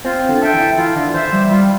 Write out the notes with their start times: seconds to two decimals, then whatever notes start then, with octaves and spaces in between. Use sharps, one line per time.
0.05 C4 F4
0.29 D3
0.41 A4 E5 G5
0.53 E3
0.78 E3 F4
0.96 D3
1.14 E3 C5 E5
1.32 G3
1.51 G3 F4